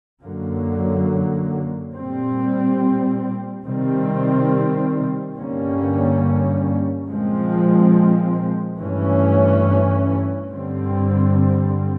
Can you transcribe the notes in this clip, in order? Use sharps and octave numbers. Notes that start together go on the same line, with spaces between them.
F#2 D3 F#3 A#3
A#2 G3 C4
C3 D#3 G3 C4
G2 D3 G3 A#3 C#4
A#2 F3 G#3 C4
G2 E3 A3 C#4
G2 D3 G3 C4